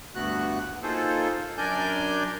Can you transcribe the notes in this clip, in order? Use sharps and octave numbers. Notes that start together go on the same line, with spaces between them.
D2 G2 A3 B3 F#4 F#6
A#3 D#4 F4 G#4 A4 C5
F#2 D4 A#4 D5 G#5 G6